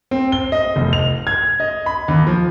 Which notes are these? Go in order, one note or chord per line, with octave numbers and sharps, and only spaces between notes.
C4
G7
D#5
F1
F7
G#6
D#5
B5
D#2
F3